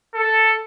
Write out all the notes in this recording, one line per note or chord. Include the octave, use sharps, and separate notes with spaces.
A4